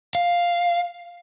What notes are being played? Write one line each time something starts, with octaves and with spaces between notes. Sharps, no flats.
F5